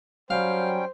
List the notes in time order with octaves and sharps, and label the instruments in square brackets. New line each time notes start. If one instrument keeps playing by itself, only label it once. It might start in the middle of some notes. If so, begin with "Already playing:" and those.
[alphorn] F#3 [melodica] G3 C#4 G5 [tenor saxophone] C5 [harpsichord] F5